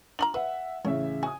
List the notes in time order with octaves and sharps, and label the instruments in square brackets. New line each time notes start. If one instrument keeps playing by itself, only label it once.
[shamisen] D4 F4 A#5 [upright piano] F#7
[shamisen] B4 [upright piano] E5 F#5
[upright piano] A1 C#3 E5 [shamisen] C#4
[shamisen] F#4 [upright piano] G#5 D#6